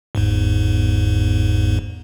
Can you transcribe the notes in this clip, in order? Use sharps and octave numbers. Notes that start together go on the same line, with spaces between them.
G1 E2 G#2